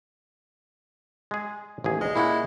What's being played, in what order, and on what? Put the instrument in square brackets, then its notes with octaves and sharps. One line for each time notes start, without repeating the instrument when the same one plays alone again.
[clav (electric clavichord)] G#3 G#4
A1 D#2 G#4
[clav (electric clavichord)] D2 [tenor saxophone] G#3
[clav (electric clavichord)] A#2 C#4 F#5 [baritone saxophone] E4